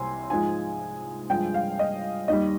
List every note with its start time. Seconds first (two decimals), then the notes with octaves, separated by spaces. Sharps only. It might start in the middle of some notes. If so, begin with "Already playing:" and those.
Already playing: C2 C3 G#5 C6
0.30 G#2 F3 G#3 G#5
1.30 G2 F3 G#3 G5
1.54 F5
1.79 D#5
2.28 D#2 D#3 G3 D#5